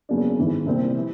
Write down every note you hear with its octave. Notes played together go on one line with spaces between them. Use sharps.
E2 C#3 F#3 A#3 D4
G#1 G#2 E3
C2 A#2 G3 C4
E3